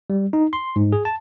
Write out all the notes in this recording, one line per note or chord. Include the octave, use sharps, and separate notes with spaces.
G3
D#4
C6
G#2
G#4
A5